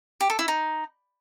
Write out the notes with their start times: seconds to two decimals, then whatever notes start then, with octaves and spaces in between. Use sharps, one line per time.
0.21 G4
0.30 A4
0.39 E4
0.48 D#4